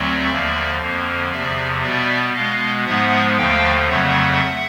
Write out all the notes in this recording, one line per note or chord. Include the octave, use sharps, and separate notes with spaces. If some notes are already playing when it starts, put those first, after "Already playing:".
Already playing: D2 D3 F#3 A3 C4 D5 E5
D#2 D3 F3 A#3
F2 D3 F3 A#3
E2 C3 F3 D5 E5
B2 G3 B3 D5 E5
B2 G#3 B3 D#5 F5
G#2 F3 G#3 B3 E5 F#5
D#2 D3 F3 A3 F5 G5
F2 C#3 F#3 A3 E5 F#5